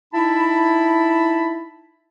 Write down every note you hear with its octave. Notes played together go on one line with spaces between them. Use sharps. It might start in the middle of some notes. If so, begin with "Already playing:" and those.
D#4 E4 A5 B5